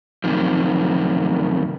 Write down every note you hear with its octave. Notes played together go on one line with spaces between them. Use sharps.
F#2 C3 D#3 F3